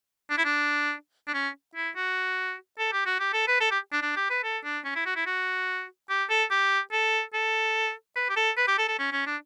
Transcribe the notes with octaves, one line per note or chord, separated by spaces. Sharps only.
D4
E4
D4
D4
C#4
E4
F#4
A4
G4
F#4
G4
A4
B4
A4
G4
D4
D4
G4
B4
A4
D4
C#4
E4
F#4
E4
F#4
G4
A4
G4
A4
A4
B4
G4
A4
B4
G4
A4
A4
C#4
C#4
D4